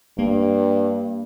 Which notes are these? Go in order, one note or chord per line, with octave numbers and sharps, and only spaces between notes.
G2 A#3